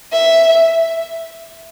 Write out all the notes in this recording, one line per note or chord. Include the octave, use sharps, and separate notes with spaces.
E5